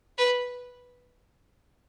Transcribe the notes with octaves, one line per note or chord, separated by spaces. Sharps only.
B4